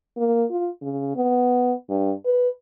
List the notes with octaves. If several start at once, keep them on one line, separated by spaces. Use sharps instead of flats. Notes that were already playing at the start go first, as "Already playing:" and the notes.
A#3
F4
C#3
B3
G2
B4